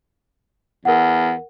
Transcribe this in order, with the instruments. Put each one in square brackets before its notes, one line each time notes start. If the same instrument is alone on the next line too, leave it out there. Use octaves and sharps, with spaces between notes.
[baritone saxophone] E2 [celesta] A#4 F#5